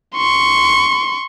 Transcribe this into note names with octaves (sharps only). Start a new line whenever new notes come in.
C6 C#6